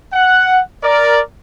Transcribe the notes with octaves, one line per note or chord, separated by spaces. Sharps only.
F#5
A#4 D5